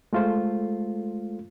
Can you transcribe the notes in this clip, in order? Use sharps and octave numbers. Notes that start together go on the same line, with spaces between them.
G#3 A3 F4 A4 C5